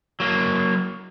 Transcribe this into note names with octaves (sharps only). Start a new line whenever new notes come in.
F#3 A#3